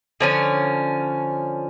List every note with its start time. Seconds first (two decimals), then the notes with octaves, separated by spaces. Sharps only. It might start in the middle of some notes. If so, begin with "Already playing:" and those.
0.20 D3 F3 C#4